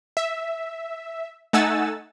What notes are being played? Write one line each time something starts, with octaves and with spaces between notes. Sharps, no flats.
E5
A3 D#4 F#5 G#5 E6 A6